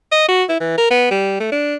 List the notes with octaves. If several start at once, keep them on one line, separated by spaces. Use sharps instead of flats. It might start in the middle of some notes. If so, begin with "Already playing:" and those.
D#5
F#4
E4
E3
A#4
B3
G3
A3
D4